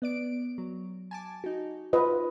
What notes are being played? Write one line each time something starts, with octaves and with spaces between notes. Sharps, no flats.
B3 D5 D7
F#3
G#5 A5 D6
D#4 F#4
F4 B4 D#5